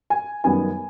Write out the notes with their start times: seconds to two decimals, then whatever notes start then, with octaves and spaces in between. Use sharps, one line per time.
0.10 G#5
0.44 F#2 D#3 G3 B3 G#5